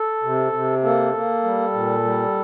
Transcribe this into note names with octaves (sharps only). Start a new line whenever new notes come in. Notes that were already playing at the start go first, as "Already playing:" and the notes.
Already playing: A4
C3
C3
A#3 A4
A#3
G3
A#2
G3